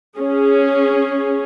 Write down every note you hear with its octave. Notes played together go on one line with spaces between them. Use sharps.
C#4 G#4